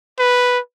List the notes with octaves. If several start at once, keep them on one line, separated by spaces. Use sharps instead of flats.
B4